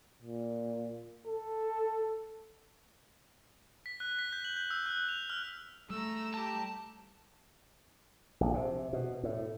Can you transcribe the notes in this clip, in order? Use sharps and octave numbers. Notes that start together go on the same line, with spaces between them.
A#2
A4
B6
F#6
B6
G6
F#7
G6
E6
F#6
F7
F6
G3 A3 A#5 E6
G4 A5 A#5
A#1
C3
B2
A2